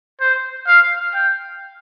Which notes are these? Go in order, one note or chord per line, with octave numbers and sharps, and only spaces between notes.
C5
F5
G5